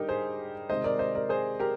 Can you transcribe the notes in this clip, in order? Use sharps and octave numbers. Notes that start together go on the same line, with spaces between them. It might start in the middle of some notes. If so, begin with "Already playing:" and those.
Already playing: D3 G3 D#4 G4 A#4
G#4 C5
C3 D#3 G#3 C5 D#5
A#4 D5
C5 D#5
A#4 D5
G#4 C5
G4 A#4